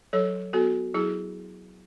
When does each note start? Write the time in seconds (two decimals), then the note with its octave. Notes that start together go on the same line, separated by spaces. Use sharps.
0.13 F#3 A4 C#5
0.53 B3 F#4 A4
0.94 F#3 E4 G#4